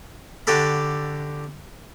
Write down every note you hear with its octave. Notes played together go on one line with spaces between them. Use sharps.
D3 F#4 G4 A4 B5